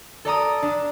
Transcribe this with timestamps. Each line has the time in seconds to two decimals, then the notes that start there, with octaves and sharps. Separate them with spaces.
0.25 A4 D5 A#5 D#6
0.63 D4